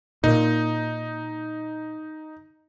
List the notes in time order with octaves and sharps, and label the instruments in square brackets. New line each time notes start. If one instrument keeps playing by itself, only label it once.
[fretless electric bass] A#2 [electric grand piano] D#4